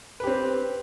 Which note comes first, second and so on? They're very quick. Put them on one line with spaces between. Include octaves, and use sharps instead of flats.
B4 G4 C4